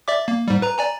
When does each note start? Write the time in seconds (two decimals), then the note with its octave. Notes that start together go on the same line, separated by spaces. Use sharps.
0.08 D5 E5 D6
0.28 A#3
0.48 G#2 G3
0.62 B4 A#5
0.78 D5 G#5 A#5